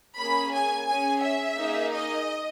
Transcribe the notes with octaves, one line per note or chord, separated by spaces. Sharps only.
A#3 C#4 G#4 B5
G#5
C#4 G#4 G#5
E5
A#3 D#4 G#4
D#5